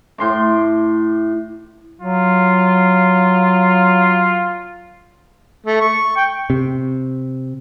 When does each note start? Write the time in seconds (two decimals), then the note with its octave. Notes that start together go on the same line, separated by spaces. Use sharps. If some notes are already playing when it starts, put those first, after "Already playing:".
0.18 A2 C6 D6
2.01 F#3 F4
5.67 A3
5.81 C#6
6.17 G5
6.50 C3